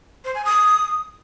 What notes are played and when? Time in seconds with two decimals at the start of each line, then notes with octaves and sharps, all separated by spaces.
0.25 C5
0.35 G#5
0.45 D#6